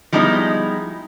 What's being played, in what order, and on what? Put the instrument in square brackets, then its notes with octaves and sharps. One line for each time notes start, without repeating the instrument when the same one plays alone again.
[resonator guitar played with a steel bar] F3 G3 G#3 B3 D#4 E4